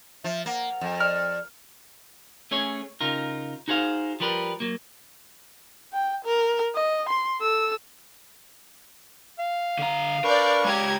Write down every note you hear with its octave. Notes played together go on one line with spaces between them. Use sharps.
F3 E5
A#3 F#5
F2
D5 F6
A3 C#4 G#4 C#5
C#3 D#4 F4 A#4
D#4 F#4 G#4 C5 F5
F3 G3 A#4 B4
F#3 A#3
G5
A#4
D#5
C6
A4 E6
F5
D3 A#5
D4 A#4 B4 D5 C#6 G6
G#3 G4 C#5 A#5 G#6